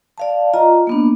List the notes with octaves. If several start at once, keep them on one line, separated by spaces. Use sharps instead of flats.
D5 F5 A5
F4 D#5 A#5
A#3 B3 D4